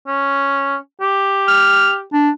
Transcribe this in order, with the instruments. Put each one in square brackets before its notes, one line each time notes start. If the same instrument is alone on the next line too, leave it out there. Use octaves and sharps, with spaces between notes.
[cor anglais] C#4
G4
[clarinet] F6
D4